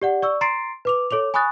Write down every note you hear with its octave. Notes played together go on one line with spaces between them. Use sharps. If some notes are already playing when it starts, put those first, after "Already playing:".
G4 D5 F#5
D5 C#6 E6
A#5 C6 A6 C7 D7
B4 D6 F7
A4 C#5 D6 F7
G#5 B5 C#6 D#6 F#6 A6